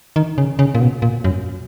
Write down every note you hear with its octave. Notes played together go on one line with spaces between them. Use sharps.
D#3
C#3
C#3
A#2
B2
A#2
F#2